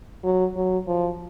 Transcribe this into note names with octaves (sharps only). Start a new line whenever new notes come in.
F#3
F#3
F3